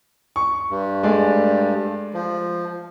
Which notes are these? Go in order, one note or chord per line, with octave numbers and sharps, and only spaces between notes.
C#6
G2
G#3 A3 D5
F3